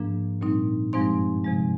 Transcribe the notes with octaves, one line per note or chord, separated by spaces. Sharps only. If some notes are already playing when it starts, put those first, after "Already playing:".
Already playing: G#2 F3 A#3 D4 A#4
A#2 G3 C4 D#4
G2 F3 G#3 C4 D#4 C5 C6
C3 F3 G#3